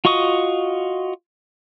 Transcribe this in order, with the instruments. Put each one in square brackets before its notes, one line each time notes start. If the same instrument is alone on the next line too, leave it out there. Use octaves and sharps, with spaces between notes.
[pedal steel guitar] F4 F#4 D#5 C#6 D#6